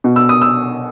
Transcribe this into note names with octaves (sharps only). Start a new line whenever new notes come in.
B2
E6
D#6
E6